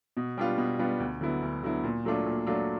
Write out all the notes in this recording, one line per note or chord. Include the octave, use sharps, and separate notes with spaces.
B2
G3 B3 D4 F4
B2
G3 B3 D4 F4
D2
D3 F#3 B3 E4
D2
D3 F#3 B3 E4
A#2
F#3 A3 D4 F4
A#2
F#3 A3 D4 F4